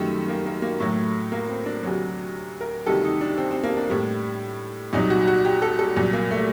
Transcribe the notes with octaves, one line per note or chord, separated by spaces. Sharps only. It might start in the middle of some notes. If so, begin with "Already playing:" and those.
Already playing: F#2 D#3 G3 A3
A#3
A#3
A#3
A2 F#3 A3
A#3
C4
D4
D2 C3 F#3
A#4
D2 C3 D#3 G3 A4
D#4
D4
C4
C4
A#3
D4
A2 G3
C2 A#2 F#3 D#4
F#4
F#4
G4
A4
A4
C2 A#2 F#3
A#3
A3